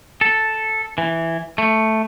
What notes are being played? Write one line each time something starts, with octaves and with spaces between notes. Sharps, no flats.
A4
E3
A3